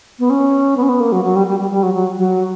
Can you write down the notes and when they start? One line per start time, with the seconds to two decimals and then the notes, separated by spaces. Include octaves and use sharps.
0.19 B3
0.30 C#4
0.77 B3
0.83 C#4
0.89 B3
1.00 A#3
1.12 F#3
1.24 F#3
1.36 G3
1.47 G3
1.59 G3
1.71 G3
1.83 F#3
1.94 F#3
2.18 F#3